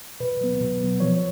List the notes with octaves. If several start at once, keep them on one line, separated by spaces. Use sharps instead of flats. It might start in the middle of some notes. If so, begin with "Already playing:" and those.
B2 B4
F#3 B3
B2
F#3 B3
F3 C#5